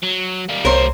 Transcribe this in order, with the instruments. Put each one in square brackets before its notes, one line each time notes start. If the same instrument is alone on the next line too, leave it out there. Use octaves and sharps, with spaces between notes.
[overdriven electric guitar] F#3
G3 A#3
[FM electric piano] C2 C#5 [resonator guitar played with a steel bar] A#4 C5